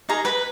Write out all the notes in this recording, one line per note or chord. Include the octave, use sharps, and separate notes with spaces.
D#4 G#4 A#4 D#5 A#5
B4 B5